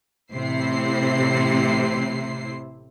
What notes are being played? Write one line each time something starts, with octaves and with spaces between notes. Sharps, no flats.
A1 A2 C3 E4 C5 C7